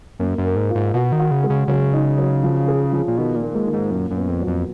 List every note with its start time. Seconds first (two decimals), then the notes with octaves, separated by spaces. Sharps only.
0.19 F#2 A#3
0.38 F#2
0.44 A#4
0.56 G#2
0.69 F4
0.75 G#2
0.94 B2 F#4
1.12 D#3
1.19 F#4
1.31 C#3
1.43 G#3
1.50 C#3
1.68 C#3 F#3
1.93 D#4
2.18 F#3
2.43 F3
2.68 G#4
2.92 F3
3.08 A#2
3.17 B2 D#3
3.36 A#2
3.42 A#3
3.55 G#2
3.67 D#3
3.73 G#2
3.91 F#2 A#2
4.11 F#2
4.16 B3
4.29 F2
4.41 F#3
4.47 F2